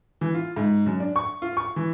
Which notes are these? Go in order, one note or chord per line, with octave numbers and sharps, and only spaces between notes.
E3
F4
G#2
F#2
D4
C#6
F4
C#6
E3